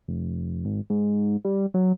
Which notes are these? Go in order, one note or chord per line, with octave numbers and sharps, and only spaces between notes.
F1
G#1
G#2
G3
F#3